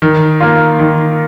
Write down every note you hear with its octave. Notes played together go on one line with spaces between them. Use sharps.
D#3
A#3 F4
D#3